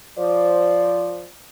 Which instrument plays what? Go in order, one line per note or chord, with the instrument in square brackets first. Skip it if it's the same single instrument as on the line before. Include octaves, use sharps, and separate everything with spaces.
[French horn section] F3 C5 D5